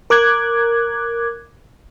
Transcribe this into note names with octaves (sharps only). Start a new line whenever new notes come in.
A#4 D6 F#6 G#6